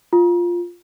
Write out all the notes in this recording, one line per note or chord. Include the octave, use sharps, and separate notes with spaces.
F4